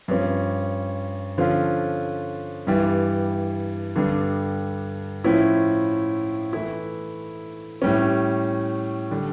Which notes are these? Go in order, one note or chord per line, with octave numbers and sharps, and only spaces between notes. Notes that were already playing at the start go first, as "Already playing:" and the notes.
G2 F3 C#4
D3 F3 C#4 F4
G2 E3 G3
G2 D3 G3 D4
A2 F3 C#4 E4
E3 A3 E4
A2 G3 C#4
D3 G3